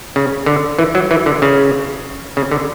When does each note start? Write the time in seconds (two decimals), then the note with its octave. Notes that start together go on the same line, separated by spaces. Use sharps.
0.16 C#3
0.46 D3
0.78 E3
0.95 F#3
1.11 E3
1.26 D3
1.42 C#3
2.37 C#3
2.51 D3